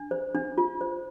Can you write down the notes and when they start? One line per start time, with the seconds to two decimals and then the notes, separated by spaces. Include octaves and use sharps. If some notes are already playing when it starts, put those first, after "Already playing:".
Already playing: D4
0.11 C5
0.35 D4
0.58 F4
0.81 C5